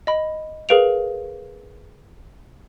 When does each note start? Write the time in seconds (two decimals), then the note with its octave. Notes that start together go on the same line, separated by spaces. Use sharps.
0.07 D#5 B5
0.69 G#4 A#4 B4 F5 D7 F7